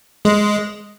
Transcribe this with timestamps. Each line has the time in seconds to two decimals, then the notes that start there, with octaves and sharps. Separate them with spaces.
0.25 G#3